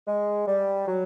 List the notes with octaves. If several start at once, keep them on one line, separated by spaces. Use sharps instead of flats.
G#3
G3
F#3